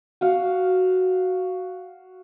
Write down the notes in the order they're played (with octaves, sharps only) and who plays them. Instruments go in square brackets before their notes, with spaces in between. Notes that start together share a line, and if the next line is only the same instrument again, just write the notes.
[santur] F#4 F5